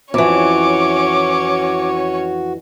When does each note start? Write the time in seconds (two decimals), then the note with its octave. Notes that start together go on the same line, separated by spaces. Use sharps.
0.14 F2 E3 C#4 F#4 C#5 D6